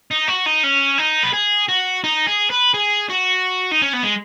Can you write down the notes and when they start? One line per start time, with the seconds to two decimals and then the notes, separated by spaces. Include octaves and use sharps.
0.11 D#4
0.28 F#4
0.46 D#4
0.64 C#4
0.98 D#4
1.23 B4
1.33 G#4
1.69 F#4
2.04 D#4
2.27 G#4
2.50 B4
2.74 G#4
3.09 F#4
3.71 D#4
3.82 C#4
3.93 B3
4.03 G#3